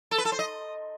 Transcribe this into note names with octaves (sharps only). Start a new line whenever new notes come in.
A4
B4
A4
C5
D#5